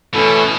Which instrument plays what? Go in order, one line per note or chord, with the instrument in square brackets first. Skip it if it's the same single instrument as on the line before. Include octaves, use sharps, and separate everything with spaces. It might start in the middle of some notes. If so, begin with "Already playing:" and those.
[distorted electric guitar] B2 [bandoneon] E3 A3 C#4 E4 A4